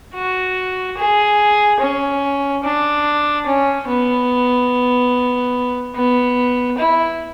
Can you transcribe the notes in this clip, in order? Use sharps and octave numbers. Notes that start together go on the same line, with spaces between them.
F#4
G#4
C#4
D4
C#4
B3
B3
E4